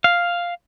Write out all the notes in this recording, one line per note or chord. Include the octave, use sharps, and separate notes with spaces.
F5